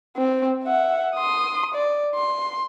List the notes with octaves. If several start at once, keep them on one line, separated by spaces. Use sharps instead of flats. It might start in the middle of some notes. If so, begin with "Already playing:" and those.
C4
E5 F#5
C6 D#6
D5
C6